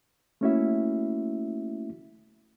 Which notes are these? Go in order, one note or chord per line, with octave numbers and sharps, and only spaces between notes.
A3 A#3 C#4 E4 F#4 E5